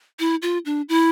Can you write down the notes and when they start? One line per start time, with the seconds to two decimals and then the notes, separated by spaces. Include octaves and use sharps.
0.20 E4
0.42 F4
0.66 D4
0.89 E4